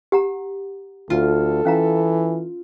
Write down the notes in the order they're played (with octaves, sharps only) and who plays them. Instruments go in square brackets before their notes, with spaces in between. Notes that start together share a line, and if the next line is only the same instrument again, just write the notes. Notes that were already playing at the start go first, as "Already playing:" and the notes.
[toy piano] G4 F#5 A#5
[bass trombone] D2 [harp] F4 [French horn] A4
[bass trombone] E3 [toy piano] C#4 F5 A#5